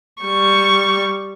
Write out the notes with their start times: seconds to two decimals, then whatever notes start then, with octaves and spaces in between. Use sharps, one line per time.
0.22 G3 C#6